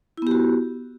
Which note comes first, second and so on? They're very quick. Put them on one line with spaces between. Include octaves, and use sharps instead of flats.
E4 B3 G4 F#4